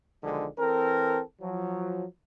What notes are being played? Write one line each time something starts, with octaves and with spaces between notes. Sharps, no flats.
B1 D3 D#3 F3 G#3
E3 C4 A4 A#4
F3 F#3